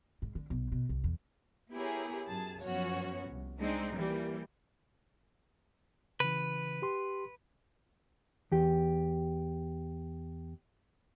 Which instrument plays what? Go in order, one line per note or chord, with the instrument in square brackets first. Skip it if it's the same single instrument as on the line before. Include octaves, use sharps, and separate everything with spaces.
[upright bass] G#2
D3
B1
B2
C2
E2
[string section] B3 E4 G4 G#4 A#4 C#5
F#2 G#4 A5
F#2 F3 B3 C#4 F#4 C#5
C2
G#3 C4 D4 D#4
E3 G3 A#3
[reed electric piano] C#3 E3 [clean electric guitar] B4
[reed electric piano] G4 C6
[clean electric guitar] E2 G4